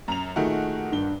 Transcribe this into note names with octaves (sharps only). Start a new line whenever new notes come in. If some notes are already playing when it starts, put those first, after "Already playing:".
F#2 A#5 F7
A#2 D#3 A3 D#4 F#4 G#4
G2 D4 G7